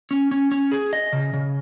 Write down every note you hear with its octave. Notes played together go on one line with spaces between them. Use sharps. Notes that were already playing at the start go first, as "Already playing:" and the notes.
C#4
C#4
C#4
G#4
D#5
C#3
C#3